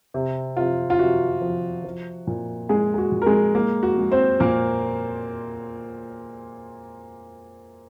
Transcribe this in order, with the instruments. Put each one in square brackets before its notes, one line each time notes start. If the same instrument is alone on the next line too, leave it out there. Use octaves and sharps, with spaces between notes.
[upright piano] C3
C3 F4
F4
C3 F#4
F3
F3
A#2
G#3 G#4
G#4
F#4
A#2
A#4
G#3 G#4
G#3 A#3 A#4
F#4
G#3
C4 C5
A#2 A#3 A#4